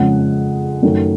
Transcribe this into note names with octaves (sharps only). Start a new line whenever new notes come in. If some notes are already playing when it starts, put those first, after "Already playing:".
Already playing: F2 C#3 F3 G#3 F#5
F#2 D#3 F#3 A3